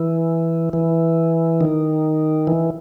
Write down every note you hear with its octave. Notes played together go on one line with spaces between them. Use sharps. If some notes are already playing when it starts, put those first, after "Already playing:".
Already playing: E3
E3
D#3
E3